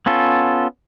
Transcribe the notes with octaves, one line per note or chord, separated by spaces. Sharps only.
B3 C#4 F4 A4